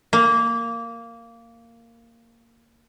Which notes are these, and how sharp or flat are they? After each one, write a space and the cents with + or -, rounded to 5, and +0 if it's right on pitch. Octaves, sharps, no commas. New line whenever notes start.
A#3 -10